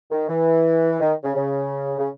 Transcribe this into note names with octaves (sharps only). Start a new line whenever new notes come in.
D#3
E3
D#3
C#3
C#3
C#3